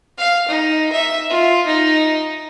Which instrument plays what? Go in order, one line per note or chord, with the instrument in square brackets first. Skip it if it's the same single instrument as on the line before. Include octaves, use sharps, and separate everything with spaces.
[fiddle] F5
D#4
E5
F4
D#4